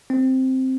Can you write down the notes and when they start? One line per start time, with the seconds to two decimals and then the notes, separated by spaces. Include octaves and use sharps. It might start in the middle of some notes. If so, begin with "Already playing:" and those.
0.10 C4